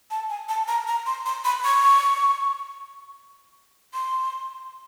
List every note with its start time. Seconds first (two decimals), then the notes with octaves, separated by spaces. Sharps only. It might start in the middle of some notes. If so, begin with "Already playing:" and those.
0.11 A5
0.29 G#5
0.49 A5
0.68 A#5
0.88 A#5
1.06 C6
1.26 C6
1.45 B5
1.64 C#6
3.94 C6